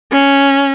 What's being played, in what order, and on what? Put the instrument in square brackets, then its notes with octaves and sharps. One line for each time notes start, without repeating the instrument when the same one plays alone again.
[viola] C#4